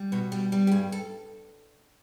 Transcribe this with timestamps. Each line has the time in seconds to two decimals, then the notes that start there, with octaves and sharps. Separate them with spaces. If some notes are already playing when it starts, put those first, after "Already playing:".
Already playing: G3
0.12 B2 F#4
0.32 G3 G4
0.52 G3
0.67 G4
0.71 G2 G#4
0.92 A4